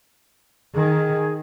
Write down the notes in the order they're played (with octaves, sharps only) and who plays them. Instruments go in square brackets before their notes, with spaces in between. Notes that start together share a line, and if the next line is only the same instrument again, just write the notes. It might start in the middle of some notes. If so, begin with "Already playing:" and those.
[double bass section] D#3 [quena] G#4